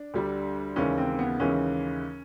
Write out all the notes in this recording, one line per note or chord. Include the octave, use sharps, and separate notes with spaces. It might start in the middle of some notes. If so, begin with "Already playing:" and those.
Already playing: D4
D2 D3 G3
D#2 C#3 E3 G#3 C#4
C4
B3
D#2 C#3 E3 G#3 C#4